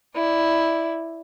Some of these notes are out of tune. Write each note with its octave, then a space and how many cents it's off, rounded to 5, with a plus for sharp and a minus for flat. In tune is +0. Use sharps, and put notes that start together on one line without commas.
E4 +0 D5 +0